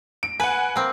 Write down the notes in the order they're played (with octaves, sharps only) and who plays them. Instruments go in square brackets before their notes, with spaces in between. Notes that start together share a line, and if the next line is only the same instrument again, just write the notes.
[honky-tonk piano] D7
[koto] B4 [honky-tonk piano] F#5 G#5
[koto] A#3 C4